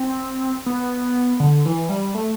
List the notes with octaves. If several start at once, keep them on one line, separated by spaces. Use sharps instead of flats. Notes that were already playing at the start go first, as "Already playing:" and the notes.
Already playing: C4
B3
D3
E3
G3
A3